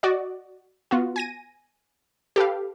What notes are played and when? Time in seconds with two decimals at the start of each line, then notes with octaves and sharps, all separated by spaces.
0.03 F#4 D5 D#5
0.91 B3 F4 F#4
1.16 G#5 A#6 D#7
2.36 G4 A4 B4 F5